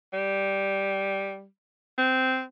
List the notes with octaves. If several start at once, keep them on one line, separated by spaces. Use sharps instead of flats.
G3
C4